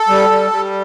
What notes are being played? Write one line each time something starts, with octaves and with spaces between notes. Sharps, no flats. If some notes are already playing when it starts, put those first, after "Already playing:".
Already playing: A4
G3
G3
G3